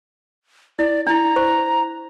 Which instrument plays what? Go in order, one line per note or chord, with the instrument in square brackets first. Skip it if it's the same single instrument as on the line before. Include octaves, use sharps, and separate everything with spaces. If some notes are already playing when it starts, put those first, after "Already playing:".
[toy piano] E4 [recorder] D5
[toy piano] D4 E4 [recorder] A#5
[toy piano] C5 C#6